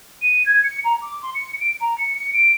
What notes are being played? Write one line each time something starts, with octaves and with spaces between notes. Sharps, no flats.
D#7
G#6
C#7
A#5
D6
C6
C#7
D7
A#5
C#7
C#7
D7